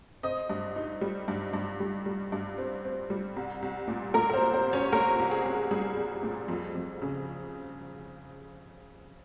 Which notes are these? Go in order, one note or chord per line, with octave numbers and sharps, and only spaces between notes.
C4 D#5 D#6
G2
D#4
G3
G2
G2
G3
G3
G2
C4
C4
G3
C2
C2
A#2
A#2 A#4 A#5
A#4
C4 C5
C2
C4 C5
C2
C#4 C#5
C2 A#3 A#4
C2
G#4
C2
G3 G#4
C2
A#2
F2
F2
C#3